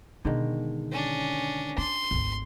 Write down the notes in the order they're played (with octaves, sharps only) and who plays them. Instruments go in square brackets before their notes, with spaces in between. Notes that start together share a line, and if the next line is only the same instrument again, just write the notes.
[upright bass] B2 [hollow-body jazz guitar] D3 D#3 G#3
[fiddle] C#4 D4
[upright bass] D4 [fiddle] C6
[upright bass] G#1 D2